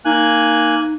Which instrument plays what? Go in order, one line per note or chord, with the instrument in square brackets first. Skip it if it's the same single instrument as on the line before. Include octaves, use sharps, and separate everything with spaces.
[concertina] A#3 G#5 F#6 [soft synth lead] D#4